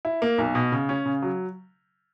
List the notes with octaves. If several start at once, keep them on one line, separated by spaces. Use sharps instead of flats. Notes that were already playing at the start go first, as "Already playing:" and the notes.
E4
A#3
B1
B2
C#3
C#4
C#3
F#3